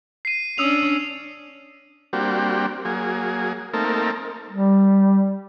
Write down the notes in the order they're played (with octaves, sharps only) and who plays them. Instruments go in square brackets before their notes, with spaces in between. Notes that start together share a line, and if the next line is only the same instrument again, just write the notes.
[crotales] C7 D#7
[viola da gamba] C#4 D4 [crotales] D#6 E6 F7
[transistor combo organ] G3 A#3 C4 D4 F#4 G4
F#3 A#3 G#4
A3 A#3 C4 D#4 A4 A#4
[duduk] G3